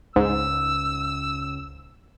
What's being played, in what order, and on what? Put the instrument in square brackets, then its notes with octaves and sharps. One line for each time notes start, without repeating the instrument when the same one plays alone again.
[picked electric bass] C#2 [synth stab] G#2 [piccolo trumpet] E6